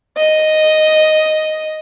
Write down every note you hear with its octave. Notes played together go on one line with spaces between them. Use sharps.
D#5